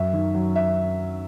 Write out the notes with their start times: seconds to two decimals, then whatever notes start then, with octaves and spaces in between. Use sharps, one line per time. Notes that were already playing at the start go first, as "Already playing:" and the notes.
Already playing: F#2 E5
0.13 D#3
0.35 F#3
0.56 E5